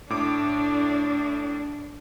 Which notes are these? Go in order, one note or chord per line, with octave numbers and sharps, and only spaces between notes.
A2 D4 D6 D7